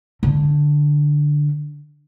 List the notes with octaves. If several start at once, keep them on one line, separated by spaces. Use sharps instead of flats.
D3